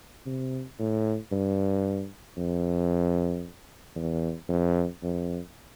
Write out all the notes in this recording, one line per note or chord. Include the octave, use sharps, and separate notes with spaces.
C3
A2
G2
F2
E2
F2
F2